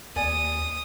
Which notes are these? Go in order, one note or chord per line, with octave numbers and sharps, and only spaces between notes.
D#2 D5 G#5 D#6